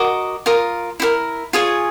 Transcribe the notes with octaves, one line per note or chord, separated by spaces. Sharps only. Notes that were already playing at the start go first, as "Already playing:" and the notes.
Already playing: F#4 A#4 D#5 D6
F4 A#4 D#6
E4 G4 A#4
F4 G#4 C#5